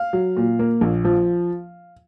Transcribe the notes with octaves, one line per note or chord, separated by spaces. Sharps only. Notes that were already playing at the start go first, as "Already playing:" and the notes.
Already playing: F5
F#3
A#2
A#3
A#1
F3